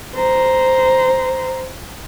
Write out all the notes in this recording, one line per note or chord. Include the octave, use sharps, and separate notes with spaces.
C5 A#5